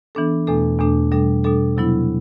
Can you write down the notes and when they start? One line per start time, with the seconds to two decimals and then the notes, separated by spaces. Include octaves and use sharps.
0.15 E3 B3 D4 A4
0.47 E2 B2 A3 D4 A4
0.80 E2 B2 A3 D4 A4
1.12 B2 G3 D4 A4
1.44 B2 G3 D4 A4
1.77 C3 F#3 B3 E4